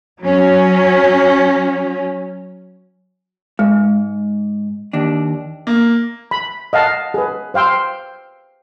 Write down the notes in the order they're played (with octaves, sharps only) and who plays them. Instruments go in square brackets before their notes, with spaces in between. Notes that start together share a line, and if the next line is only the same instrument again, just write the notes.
[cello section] F#3 C#4
[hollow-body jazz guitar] G#2 [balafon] G#3
[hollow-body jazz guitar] D#2 D4
[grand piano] A#3
[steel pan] B5
D#5 F5 F#5 A5
G#4 B4
C5 F5 G5 C6 E6